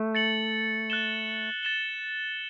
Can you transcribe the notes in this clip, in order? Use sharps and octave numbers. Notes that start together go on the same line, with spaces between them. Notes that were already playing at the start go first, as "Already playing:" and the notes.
Already playing: A3
A6 C#7 F#7
F#6 A6 E7 G7
A6 E7 G7